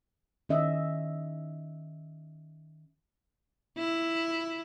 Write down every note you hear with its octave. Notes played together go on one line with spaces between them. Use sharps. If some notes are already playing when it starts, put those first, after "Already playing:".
D#3 C#4 D#5 E5
E4